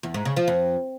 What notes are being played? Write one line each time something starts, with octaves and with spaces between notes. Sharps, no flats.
E2
G#2
C#3
F3
F2